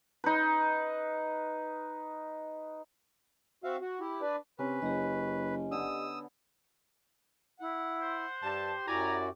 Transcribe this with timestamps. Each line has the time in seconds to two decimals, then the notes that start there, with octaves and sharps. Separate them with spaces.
0.24 D#4 B4
3.64 C4 F#4 E5 F5
3.82 F#4
4.00 E4 G4
4.22 D4 B4 D5
4.59 C3 C#4 B4
4.82 F#1 G4 D#5
5.72 D3 B3 D#6 E6
7.60 E4 F#5
8.01 C5
8.43 G2 G4 A5
8.88 F#2 E4 F#4 D5 G#5 A#5